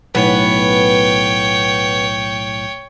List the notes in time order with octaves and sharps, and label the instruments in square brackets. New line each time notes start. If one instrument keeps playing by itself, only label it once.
[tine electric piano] B1 A2 [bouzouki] B3 [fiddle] C#5 G5